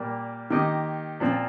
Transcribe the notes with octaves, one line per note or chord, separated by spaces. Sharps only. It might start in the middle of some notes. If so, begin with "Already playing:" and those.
Already playing: A#2 G3 A#3 G4
D#3 A#3 D#4 G4 D#5
A#2 F3 C4